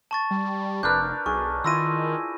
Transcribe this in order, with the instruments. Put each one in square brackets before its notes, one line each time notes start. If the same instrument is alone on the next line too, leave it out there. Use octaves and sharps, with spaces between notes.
[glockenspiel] A5 C#6 A6
[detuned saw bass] G3
[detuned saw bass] F1 [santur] D4 A#4 B4 [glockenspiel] F6 G6
[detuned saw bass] B1 [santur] G#4 [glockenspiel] C#6
[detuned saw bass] D#3 [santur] E4 F4 C6 [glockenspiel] E6 A#6 D#7